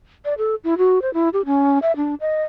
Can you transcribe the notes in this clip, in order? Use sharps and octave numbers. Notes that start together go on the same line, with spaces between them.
D5
A4
E4
F#4
C5
E4
G4
C#4
E5
D4
D#5